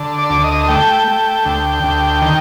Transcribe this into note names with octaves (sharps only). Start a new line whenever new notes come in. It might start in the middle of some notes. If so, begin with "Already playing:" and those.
Already playing: D3
D5
D2
D#5
A3 G5
A3
D2
D2
D#3